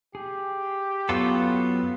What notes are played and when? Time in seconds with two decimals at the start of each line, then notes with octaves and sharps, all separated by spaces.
0.15 G4 G#4
1.09 F#2 F#3 B3 F4 A4